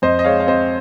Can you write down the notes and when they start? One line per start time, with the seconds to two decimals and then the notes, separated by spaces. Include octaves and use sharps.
0.02 F2 C5 D#5
0.19 D#5
0.24 G#3 C#5 F5
0.40 F5
0.47 C4 C5 D#5